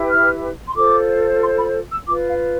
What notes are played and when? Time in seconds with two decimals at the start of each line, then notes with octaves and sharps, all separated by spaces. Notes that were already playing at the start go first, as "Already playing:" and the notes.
Already playing: E4 G4 B4
0.10 F6
0.67 C6
0.75 F4 A4 C5 D6
1.40 C6
1.57 B5
1.90 E6
2.05 F4 B4 D6
2.28 F5